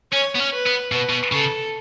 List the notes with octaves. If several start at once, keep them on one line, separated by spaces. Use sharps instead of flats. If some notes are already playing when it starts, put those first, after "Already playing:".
C#4 C#5
B3
C#4
B4
B3
B2 B4
B2
C#3 A4